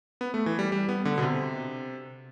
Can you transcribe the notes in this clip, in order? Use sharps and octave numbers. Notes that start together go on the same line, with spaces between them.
B3
A3
E3
G3
G3
B3
D3
B2
C3